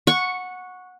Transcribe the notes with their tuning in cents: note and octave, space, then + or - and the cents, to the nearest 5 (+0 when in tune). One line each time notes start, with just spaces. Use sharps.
F#5 -15 C#6 +0